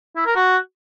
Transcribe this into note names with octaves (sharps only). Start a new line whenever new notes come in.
E4
A#4
F#4